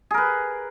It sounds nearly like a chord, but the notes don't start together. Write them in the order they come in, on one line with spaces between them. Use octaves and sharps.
G#4 A#4 B4